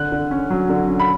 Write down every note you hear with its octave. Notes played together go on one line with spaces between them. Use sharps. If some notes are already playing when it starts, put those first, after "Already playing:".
Already playing: D3 F#6
D3
C#4
F#3
D3
C#4
B5